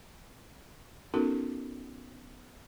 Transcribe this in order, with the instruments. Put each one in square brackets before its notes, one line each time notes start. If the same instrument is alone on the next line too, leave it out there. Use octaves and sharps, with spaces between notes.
[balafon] B3 C#4 D#4 F#4 A4 A#4